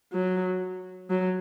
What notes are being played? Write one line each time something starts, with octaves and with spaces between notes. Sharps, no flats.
F#3
F#3